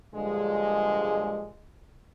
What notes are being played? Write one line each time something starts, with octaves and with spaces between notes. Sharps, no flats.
G2 A#2 D3 F3 G#3